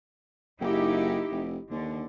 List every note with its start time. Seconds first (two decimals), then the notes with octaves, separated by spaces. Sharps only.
0.61 F#1 D#4 E4 G4
1.31 F1
1.71 D#2 D3